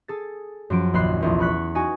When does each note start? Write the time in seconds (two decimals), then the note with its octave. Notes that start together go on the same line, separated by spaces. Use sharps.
0.08 G#4 A4 A6
0.70 F#2 F3 D7
0.94 A#1 D#2 B5 C6 F#6 C7
1.20 F1 A#1 E2
1.39 B5 C#6 F#6 B6
1.75 D#4 F#4 G#5